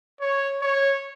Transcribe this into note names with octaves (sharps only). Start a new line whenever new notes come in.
C#5
C#5